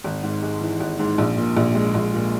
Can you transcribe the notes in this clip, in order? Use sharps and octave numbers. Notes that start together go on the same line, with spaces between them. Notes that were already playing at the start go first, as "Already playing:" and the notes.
G#1
G#2
G#3
E3
G#1
G#2
A#1
A#2
A#1
G#3
A#1
A#2